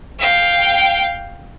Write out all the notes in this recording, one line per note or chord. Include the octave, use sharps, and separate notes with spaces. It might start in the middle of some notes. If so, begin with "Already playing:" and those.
F5 G5